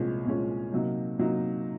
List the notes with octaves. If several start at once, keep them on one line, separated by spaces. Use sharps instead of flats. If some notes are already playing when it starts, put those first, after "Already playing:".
Already playing: C2 A#2 F3 G#3 C#4
C2 A#2 F3 G#3 C#4
C3 F#3 A#3 D#4
C3 F#3 A#3 D#4